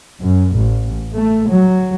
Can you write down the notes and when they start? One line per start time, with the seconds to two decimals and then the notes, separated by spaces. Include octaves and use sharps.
0.20 F#2
0.55 A1
1.13 A3
1.49 F#3